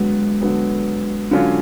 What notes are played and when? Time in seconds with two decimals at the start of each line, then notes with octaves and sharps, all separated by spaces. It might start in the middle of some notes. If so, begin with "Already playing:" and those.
Already playing: D3 F#3 G#3 B3
0.41 D3 F#3 B3
1.31 D3 F#3 C#4 F4